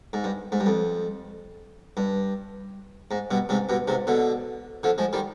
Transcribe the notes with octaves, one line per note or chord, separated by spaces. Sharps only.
G#2
G2
G#2
G2
F2
G2
G#2
G2 B2
G#2 C3
G2 B2
G#2 C3
B2 D3
D3 F3
F3 G#3
D#3 G3